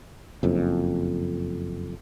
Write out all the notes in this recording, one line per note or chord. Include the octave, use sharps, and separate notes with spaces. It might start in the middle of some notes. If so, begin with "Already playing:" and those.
F#1 F2